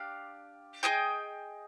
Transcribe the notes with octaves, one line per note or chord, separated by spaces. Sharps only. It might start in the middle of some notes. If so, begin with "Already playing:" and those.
Already playing: D4 G4 D5 F5
G#4 C5 D#5 G5